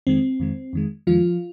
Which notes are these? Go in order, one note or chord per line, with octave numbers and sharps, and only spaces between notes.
F2 D#3 G#3 C4
F2 D#3 G#3
F2 D#3 G#3
F2 D#3 F3 G#3 F4